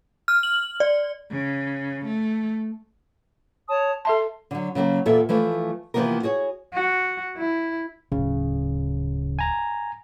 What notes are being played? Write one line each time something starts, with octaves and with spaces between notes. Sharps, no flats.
F6
F#7
D5
C#3
A3
C#5 A5 D#6
A4 E5 A5 C6
D3 F#3
C#3 F#3 A3 A#3
E2 A#2 A4 E5
E3 F3 A3
C3 E3 F3 A#3 B3 A#4
F#4 G#4 C#5
F#4
E4
D1 C#3
G#5 A#5